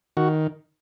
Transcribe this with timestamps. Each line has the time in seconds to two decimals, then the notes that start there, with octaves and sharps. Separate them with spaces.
0.17 D#3 F#4